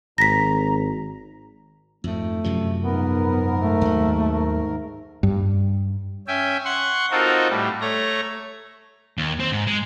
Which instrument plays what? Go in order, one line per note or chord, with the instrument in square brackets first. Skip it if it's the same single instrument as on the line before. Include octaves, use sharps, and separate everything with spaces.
[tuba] G#1 [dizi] A#5 [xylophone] A#6 B6
[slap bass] F2 G#2 [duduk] A3
[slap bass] F#2 C3 F3
[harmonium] G#2 A#4 [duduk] B3
[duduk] A3
[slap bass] D#2 F#3
[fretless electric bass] G2
[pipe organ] C#4 E5 G5 G#5
F#5 C6 C#6
C4 D#4 F4 F#4 A4 A#4
A2 G3
A3 C#5 A#5
[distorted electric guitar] D#2
C4
G#2
G#3